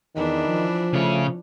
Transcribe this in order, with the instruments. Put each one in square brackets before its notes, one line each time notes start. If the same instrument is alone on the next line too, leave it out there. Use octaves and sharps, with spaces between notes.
[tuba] E2 [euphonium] D#3 [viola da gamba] E3 D4 E4
[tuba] F3
[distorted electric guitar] C#3 C#5 [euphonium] A3